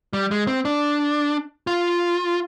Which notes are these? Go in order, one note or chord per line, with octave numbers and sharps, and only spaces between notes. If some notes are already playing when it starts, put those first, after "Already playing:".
G3
G#3
C4
D4
F4